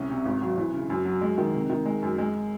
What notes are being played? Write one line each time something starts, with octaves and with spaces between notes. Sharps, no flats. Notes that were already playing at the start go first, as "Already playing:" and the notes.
Already playing: C2 C#4
C3
G#1
F#3
E3
C#3
F#2
F#3
G#3
D#3
C3
D#3
G#3
F#2
G#3